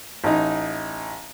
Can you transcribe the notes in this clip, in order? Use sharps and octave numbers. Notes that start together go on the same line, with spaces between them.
A1 D#4